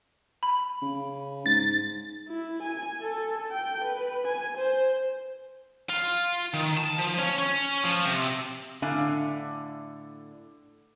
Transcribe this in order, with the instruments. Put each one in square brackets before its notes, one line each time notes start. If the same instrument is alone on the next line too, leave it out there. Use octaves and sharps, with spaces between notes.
[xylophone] B5
[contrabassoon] C#3
[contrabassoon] G#2 [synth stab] A6
[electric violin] E4
G#5
A4
G5
B4
G#5
C5
[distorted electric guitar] F4
D#3
A5
F3
C#4
C#4
F3
C3
[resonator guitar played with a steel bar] A2 D3 D4 E5 F5 G#5